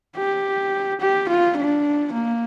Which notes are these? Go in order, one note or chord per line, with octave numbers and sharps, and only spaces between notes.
G4
G4
F4
D4
A#3